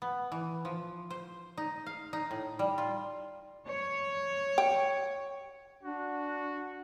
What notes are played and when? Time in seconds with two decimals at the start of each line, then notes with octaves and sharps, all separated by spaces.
0.02 B3
0.32 E3
0.65 F3
1.10 C5
1.57 D#4
1.86 F5
2.13 D#4
2.31 A2
2.59 G3
2.78 F4
3.68 C#5
4.58 G5
5.83 D4 F#4